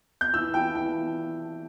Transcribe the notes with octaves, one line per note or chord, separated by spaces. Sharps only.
G6
E3 E6
E3 G5
E3 G5